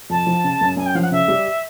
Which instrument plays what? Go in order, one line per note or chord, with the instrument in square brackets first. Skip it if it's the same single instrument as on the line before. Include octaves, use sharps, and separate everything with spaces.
[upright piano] F2 [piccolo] A5
[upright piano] F3
C#3
F#2
[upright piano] F#2 [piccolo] G#5
[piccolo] G5
[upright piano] F3 [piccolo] F5
[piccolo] F#5
[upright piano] C#3 [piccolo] E5
[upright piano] G3